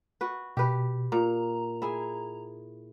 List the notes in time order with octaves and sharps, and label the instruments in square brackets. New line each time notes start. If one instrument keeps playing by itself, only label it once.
[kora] F#4 B4
[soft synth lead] B2 [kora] G4 B4
[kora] A#2 [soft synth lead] A#5
[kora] E4 G#4